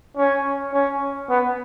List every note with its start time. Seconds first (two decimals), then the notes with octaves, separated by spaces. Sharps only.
0.17 C#4
0.73 C#4
1.30 B3